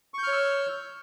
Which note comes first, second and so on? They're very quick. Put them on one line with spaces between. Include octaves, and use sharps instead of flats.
C#6 G6 F6 C#5 E6